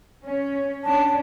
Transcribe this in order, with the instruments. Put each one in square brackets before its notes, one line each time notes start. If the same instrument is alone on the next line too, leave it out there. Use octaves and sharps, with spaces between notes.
[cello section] C#4
[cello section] C#4 D4 [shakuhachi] A5